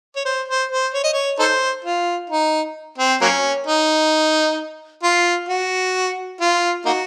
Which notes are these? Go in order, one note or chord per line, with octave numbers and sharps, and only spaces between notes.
C#5
C5
C5
C5
C#5
D#5
C#5
D#4 A4 C5
F4
D#4
C4
F#3 A#3 C#4
D#4
F4
F#4
F4
A#3 D#4 F#4